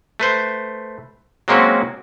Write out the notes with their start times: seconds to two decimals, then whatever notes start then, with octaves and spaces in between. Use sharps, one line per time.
0.20 A3 B4 C5
1.48 F#3 G#3 A#3 C4 C#4 F#4